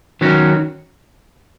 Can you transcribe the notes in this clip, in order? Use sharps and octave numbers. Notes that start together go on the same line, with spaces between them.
D#3 F#3 C#4 F#4